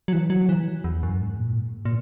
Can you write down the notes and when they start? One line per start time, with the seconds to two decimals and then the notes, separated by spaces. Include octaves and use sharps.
0.08 F#3
0.13 E3
0.30 F#3
0.49 E3
0.84 E2
1.03 F#2
1.21 G#2
1.39 A#2
1.58 G#2
1.85 A#2